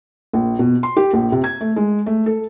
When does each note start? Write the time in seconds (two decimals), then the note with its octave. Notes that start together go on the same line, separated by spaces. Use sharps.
0.33 A#1
0.59 B2
0.83 C6
0.97 G4
1.13 A#1
1.32 C3
1.44 G#6
1.61 A3
1.76 G#3
2.06 A3
2.26 A4